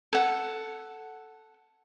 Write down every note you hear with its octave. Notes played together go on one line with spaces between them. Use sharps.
A4 F#5